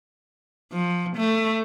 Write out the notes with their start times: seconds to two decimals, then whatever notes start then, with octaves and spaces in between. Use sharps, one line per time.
0.72 F3
1.17 A3